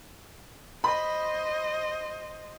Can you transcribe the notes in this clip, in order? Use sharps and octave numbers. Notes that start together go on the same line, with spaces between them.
C5 D#5 B5